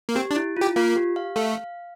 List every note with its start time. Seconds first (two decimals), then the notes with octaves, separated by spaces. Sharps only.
0.09 A#3
0.15 C4 G4
0.31 D4
0.36 E4
0.57 F4 G4
0.76 A#3 F4
0.96 G4
1.16 F5
1.36 A3 F5